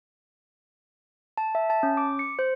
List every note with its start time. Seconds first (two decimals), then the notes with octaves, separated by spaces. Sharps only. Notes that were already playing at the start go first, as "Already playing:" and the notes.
1.38 A5
1.55 E5
1.70 A5
1.83 C#4
1.97 D6
2.19 C#7
2.39 C5